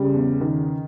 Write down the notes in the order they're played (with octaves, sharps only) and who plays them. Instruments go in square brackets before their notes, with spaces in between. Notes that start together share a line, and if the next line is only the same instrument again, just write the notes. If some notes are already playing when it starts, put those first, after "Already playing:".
Already playing: [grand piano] C#3 [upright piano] G3
[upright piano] E2
D#3